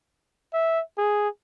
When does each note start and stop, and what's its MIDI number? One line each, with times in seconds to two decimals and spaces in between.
0.53 0.81 76
0.98 1.28 68